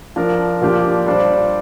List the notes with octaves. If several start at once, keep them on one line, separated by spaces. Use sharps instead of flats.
F3 D4 A#4
A#2 F3 A#3 D4 G4
G3 D4 F4 C5